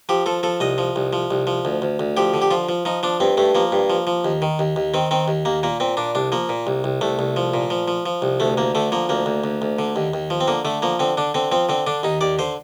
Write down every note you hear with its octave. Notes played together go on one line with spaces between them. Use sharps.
F3 G4
F3 A4
F3 A4
C2 D#5
F3
C2
F3
C2
F3
D2
D2
D2
F3 G4
D3
G4
F3 F4
F3
F3 D#4
F3 D4
G2 C4
G2 A3
F3 A#3
G2
F3
F3
D#2
D#3
D#2
D#2
D#3 C4
D#3 C4
D#2
D#2 A#3
A#2 A#3
A#2 C4
A#2 D4
C2 D4
F3 A#3
A#2
C2
C2
C2 A3
C2
F3
A#2
F3
F3
F3
C2
D2 A3
D2 A#3
D3 A3
F3 A#3
D2 A#3
D2
D2
D2
D3
D#2
D#2
F3
C4
D3 A#3
D3 A3
F3 A#3
D3 C4
D3 D4
D3 C4
F3 C4
D3 C4
D3 D4
D#2 D#4
D#2 D5
D3 C5